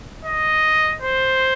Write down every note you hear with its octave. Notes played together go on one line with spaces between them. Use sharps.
D#5
C5